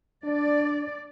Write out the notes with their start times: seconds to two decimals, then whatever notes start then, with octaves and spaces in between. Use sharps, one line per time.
0.24 D4 D5